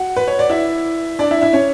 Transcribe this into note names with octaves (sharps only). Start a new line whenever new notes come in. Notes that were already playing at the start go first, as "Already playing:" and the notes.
Already playing: F#4 F#5
B4
C#5
D5
E4 E5
D4 D5
E4 E5
E4 E5
C#4 C#5